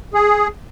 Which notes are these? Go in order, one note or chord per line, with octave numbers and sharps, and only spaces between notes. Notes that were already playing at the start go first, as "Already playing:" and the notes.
G#4